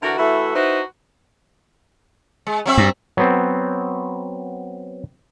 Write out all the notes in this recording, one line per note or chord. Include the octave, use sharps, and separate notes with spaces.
D3 E3 F#4 A#4
E3 A3 E4 F#4 A4
D#4 E4 F#4 B4 C5
G#3
F#3 C4 E5
G2
F#3 B3 C4